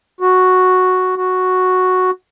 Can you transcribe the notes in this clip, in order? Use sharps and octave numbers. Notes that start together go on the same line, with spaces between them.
F#4
F#4